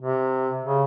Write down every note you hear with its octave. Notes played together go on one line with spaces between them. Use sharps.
C3
C#3